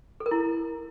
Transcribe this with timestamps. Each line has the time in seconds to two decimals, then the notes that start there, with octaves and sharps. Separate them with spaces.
0.20 A4
0.26 A#4
0.31 E4